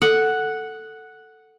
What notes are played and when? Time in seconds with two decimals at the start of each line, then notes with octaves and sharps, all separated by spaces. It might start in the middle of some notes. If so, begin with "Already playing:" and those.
0.02 A4 F#5